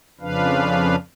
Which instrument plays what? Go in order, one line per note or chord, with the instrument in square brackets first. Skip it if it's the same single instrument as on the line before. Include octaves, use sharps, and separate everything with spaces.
[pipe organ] F2 C#3 F3 D4 B4 F5